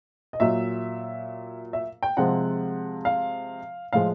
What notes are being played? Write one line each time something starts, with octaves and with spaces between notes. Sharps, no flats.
D#5
A#2 F#3 E5
E5
G5
C3 F3 G#3 F#5
F5
A2 F3 G#3 F5